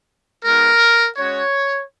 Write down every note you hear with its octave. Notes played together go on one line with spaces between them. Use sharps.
G#3 B3 D#4 F#4 A#4
G#3 C#4 F#4 C#5